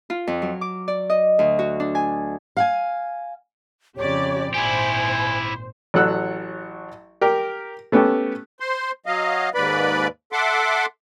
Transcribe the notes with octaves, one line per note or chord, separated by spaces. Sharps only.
F4
F2
F#3
D6
D5
D#5
D2
F#4
D4
G#5
F5 F#5 G#5
F2 C#3 G4 C#5 D5
G#1 A#2 E4 G4 C5 G#5
A1 F#3 A4 F#5 E6 F#6
G4 A#4
A3 B3 C#4 G4 A4
C5 C6
F#3 D#5 F5
D#2 G#2 B4 D5 B5
A4 E5 F#5 C6 D6